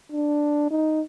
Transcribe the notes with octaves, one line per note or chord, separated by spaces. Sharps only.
D4
D#4